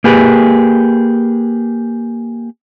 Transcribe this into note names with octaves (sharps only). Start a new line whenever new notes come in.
A#3 G4 G#4 B4